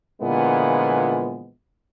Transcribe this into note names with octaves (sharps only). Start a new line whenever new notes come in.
A#2 D3 E3 F3 G#3 B3